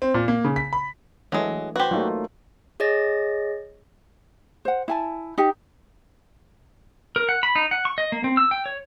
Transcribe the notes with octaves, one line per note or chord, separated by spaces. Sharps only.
C4
A#2
A#3
C#3
B6
B5
E3 F#3 G#3 A3 D4
F#4 G4 B4 C5
F#3 A3 A#3 D#4 F4
G#4 C#5 D#5 A6 A#6
C5 F#5
E4 G#5 A5
D#4 G4 G5
A#4
F#5
B5
D#4
F#5
C#6
D#5
A#3
C4
E6
G5
C#5